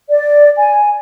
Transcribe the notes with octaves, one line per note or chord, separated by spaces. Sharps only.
D5
G#5